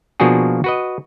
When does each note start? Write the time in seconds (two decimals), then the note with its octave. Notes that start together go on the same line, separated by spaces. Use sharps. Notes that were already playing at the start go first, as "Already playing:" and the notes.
0.20 B2 F3 A#3 D4 F#4 G#4
0.64 F#4 B4 D#5